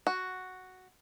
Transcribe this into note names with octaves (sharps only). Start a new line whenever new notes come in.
F#4